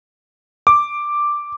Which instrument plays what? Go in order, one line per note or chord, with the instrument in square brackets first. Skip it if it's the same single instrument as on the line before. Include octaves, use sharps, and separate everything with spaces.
[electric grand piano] D6